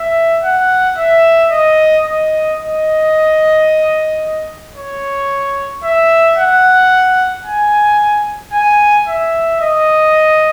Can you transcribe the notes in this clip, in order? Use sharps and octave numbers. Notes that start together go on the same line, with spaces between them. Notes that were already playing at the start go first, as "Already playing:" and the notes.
Already playing: E5
F#5
E5
D#5
D#5
D#5
C#5
E5
F#5
G#5
G#5
E5
D#5